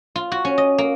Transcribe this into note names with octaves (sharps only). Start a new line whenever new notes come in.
F4
F#4
C#4
D#5
A#3